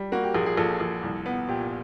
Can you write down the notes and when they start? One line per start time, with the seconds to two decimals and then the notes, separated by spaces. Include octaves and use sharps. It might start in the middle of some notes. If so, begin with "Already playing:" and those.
Already playing: G3
0.12 A#3 F#4
0.23 G4
0.34 A#1 G#4
0.46 G#4
0.57 A#1 A4
0.80 A#1
1.03 C2
1.26 B3
1.48 A#2 G4